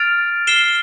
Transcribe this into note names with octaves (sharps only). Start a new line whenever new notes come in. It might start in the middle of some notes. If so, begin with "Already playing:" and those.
Already playing: F6 A6 D7 F7
F6 C7 E7 G7